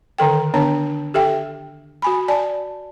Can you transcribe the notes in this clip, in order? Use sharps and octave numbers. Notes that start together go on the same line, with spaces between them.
D3 D#3 A4 G5
D3 B3 D4 C#5 A5
G4 A4 E5 G5
F#4 G#5 B5
D5 G#5 A5